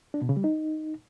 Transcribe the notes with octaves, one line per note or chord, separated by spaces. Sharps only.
D4
B2
C#3
G3
D#4